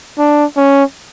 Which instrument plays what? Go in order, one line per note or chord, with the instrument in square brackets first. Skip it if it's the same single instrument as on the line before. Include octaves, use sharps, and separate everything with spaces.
[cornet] D4
C#4